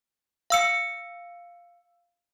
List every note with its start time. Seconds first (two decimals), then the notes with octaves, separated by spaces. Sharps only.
0.50 F5 E6 C#7